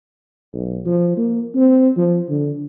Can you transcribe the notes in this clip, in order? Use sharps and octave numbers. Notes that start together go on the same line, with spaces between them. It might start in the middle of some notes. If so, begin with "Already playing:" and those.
B1
F3
A#3
C4
F3
D3